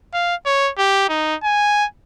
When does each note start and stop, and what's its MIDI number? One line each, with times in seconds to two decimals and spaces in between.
0.13 0.35 77
0.46 0.71 73
0.78 1.09 67
1.09 1.35 63
1.43 1.86 80